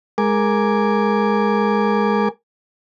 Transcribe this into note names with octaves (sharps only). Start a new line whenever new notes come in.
G#3 A#4 G#5 D6